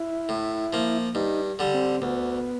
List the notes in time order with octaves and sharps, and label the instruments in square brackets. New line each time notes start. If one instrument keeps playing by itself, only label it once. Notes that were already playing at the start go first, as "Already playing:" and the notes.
Already playing: [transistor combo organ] E4
[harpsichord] A2
F3 A#3
[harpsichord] G2 [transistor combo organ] D#4
[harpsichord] D3 G3
[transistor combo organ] C4
[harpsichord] D2 [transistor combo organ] B3